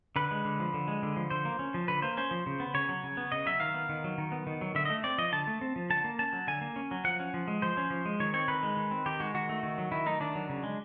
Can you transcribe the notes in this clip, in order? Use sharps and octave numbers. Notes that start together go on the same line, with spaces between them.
D3 B4
G#3
D3
F3
D3
G#3
D3
F3
D3 C5
A#3
C#4
F3
D3 B4
A#3 C5
C#4 C5
F3
C#3
B3
C#3 C#5
F#3
C#3
B3
C#3 D#5
F#3 E5
D#3 F5
B3
D#3
F#3
D#3
B3
D#3
F#3
D3 E5
A3 D#5
C4 D5
F3 D#5
D3 A5
A3
C4
F3
D3 A5
A#3
C#4 A5
F#3
D3 G#5
A#3
C#4
F#3
F3 F#5
C#4
F3
G#3
F3 C5
C#4
F3
G#3
D#3 C#5
C4 C#5
D#3 B4
G#3
D#3
C4
D#3 G4
G#3 F#4
D#3 F#4
A3
D#3
F#3
D#3 E4
A3 D#4
D#3 D4
F#3
C#3
G#3